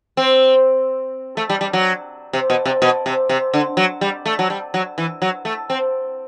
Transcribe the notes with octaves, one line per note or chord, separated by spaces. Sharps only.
C4
A3
G3
G3
F#3
C3
B2
C3
B2
C3
C3
D3
F#3
G3
A3
F#3
G3
F#3
E3
F#3
A3
C4